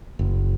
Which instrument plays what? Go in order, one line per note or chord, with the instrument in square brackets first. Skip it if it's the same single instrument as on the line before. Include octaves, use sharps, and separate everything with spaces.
[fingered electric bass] F#1